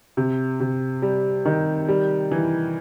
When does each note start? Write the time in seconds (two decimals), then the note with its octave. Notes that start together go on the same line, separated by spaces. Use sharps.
0.17 C3
0.60 C3
1.02 G3
1.45 D#3
1.88 G3
2.32 E3